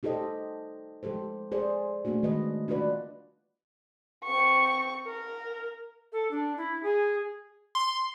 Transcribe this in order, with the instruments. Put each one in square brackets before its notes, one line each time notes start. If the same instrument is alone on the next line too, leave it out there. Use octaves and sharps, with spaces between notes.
[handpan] D#4 G4 A4 C5 D#5
F3 G#3 G4 A4 C5
G#4 C5 D5
A3 A#3 C4 D4 F#4
D#3 G#3 B4 D#5
D4 F4 F#4 B4 D5
[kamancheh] C4 C#6
A#4
[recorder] A4
D4
E4
G#4
[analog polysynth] C6